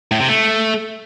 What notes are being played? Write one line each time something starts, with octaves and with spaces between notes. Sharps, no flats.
A2
C3
A3